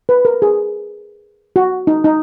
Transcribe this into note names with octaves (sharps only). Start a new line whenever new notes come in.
B4
A#4
G#4
F#4
D#4
D#4